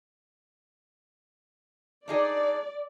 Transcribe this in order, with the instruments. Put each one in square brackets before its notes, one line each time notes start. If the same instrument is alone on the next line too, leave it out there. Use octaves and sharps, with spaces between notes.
[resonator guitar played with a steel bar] D4 D#4 G#4 [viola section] D5